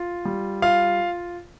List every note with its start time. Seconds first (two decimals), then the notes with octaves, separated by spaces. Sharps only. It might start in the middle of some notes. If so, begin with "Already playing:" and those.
Already playing: F4
0.25 G3
0.62 F4 F5